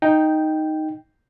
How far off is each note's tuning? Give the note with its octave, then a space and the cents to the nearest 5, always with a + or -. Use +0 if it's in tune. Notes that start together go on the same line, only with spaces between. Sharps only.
D#4 +0 G5 +0